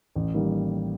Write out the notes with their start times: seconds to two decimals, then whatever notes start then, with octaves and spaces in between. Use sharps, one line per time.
0.16 A1
0.34 D#3 G3 A#3